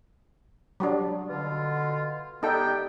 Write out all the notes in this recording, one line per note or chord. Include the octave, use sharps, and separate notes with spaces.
F#3 G3 D4
B2 D3 F4
G3 B3 D#4 A4 G5